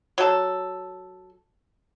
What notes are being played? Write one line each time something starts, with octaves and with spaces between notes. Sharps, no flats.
F#3 A4